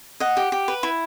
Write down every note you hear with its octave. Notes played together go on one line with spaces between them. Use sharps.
D#5 F#5
G4
G4
B4
E4